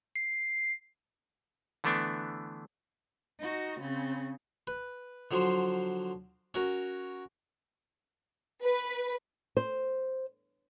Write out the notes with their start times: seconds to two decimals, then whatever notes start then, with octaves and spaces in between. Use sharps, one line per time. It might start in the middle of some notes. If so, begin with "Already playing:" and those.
0.16 C7
1.84 D3 E3 A3 B3 D4
3.39 D#4 F#4
3.79 C#3 C4
4.67 B4
5.31 D3 F3 F#3 C5 C6
6.54 C#4 F#4 A#4
8.64 B4
9.57 C5